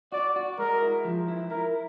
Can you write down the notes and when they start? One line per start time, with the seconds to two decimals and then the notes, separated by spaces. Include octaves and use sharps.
0.12 F#4 D5
0.36 F#4
0.59 G#3 A#4
0.82 E4
1.05 F3
1.28 E4
1.51 E4 A#4